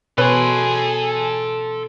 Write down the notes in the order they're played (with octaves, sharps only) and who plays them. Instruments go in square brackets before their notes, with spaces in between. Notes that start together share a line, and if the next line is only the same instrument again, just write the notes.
[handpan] B2 C#5 [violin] G#4 [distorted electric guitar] A4 C6 [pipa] B4